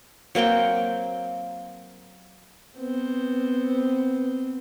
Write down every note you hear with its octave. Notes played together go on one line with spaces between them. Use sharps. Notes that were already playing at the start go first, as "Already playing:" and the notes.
F#3 A#3 C4 G5
B3 C4